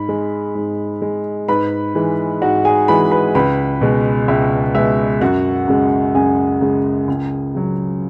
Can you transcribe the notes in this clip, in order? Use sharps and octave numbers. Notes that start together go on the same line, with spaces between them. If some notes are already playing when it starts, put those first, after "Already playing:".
Already playing: G#2 B5
G#3
G#2
G#3
G#2 B4 B5
E3 G#3
G#2 F#4 F#5
G#4 G#5
E3 G#3 B4 B5
B4 B5
C#2 B4 B5
B2 G#3
C#2 E5
B2 G#3 E5
F#2 F#4 F#5
C#3 G#3
F#2 G#4 G#5
C#3 G#3
C#2
C#3 F#3